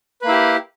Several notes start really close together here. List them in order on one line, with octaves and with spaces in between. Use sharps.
B4 A#3 E4 G4